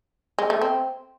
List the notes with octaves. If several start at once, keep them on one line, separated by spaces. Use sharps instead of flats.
G#3
A3
C4